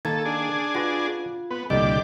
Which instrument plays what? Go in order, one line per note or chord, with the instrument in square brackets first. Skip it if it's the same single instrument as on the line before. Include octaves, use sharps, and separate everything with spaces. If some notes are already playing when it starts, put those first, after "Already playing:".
[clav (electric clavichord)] D#3 A#3 [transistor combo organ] A4 [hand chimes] A5 G#6
[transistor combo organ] D4 G#4
[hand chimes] F4 [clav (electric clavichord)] F#4 B4 F#5
[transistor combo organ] B3 [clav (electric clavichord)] B4
[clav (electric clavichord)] C2 F2 A#2 [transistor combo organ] D3 G4 D6 [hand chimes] D#5